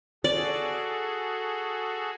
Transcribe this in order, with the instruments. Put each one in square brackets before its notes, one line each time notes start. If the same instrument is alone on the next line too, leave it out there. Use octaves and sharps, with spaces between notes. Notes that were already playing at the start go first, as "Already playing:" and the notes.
[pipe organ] F#4 G#4 A4 [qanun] D5